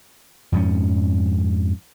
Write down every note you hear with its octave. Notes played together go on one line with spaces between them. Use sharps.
F2 G#2 F3 C#4